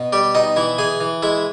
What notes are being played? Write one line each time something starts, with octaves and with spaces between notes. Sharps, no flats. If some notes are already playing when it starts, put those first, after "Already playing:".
Already playing: B2
G3 G4 G5
B2 D#4 D#5
E3 E4 E5
E3 G#4 G#5
E3
G#3 E4 E5